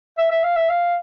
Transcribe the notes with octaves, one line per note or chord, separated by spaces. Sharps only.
E5
E5
F5
E5
F5